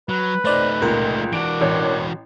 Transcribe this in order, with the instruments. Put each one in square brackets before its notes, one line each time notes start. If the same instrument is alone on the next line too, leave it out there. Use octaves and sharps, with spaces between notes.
[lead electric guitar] F#3 [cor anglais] B4
[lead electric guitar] A3 D#4 [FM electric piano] C5 D5 F#6
[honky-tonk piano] C#2 A#2 [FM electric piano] A#4
[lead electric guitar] E3 F#4 [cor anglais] D4 [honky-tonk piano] D7
[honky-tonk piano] A1 C#5